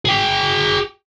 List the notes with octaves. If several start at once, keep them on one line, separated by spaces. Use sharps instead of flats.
G#4 G5